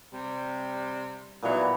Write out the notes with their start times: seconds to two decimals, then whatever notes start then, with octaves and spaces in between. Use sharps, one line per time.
0.13 C3 G3
1.42 A#2 E3 F#3 G3 B3 D#4